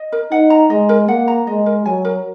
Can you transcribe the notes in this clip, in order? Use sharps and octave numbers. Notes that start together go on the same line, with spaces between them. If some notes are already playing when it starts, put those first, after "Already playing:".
Already playing: D#5
A#4
D#4 F#5
A#5
G#3 D#5
A#4
A#3 F#5
A#5
G#3 D#5
A#4
F#3 G#5
A#4